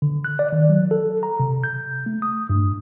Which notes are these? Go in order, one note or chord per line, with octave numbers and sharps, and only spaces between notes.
D3
F#6
D5
D#3
F#3
A4
A#5
C3
G6
A3
D#6
G2